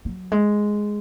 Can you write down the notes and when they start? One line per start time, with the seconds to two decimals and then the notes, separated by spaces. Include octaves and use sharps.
0.05 F#3
0.32 G#3